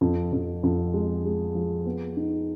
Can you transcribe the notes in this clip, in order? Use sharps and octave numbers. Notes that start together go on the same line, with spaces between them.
F2
F2
F2
G#3
G#3
F3
B3
D#4